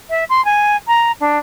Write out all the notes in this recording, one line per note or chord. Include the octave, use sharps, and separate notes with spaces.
E5
C6
G#5
A#5
D4